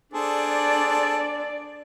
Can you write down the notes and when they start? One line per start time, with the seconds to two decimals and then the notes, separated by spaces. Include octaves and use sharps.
0.14 D4 G#4 A4 C5 D5